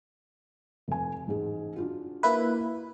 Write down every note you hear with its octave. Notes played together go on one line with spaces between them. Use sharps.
F1 G#5
A1 G#2 G#4
D4 F4 F#4
A#3 E4 B4